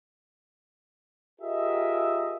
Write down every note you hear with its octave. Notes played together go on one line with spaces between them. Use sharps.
F4 G4 G#4 A#4 D#5 E5